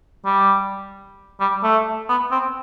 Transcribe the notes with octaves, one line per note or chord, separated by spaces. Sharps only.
G3
G3
A3
B3
C4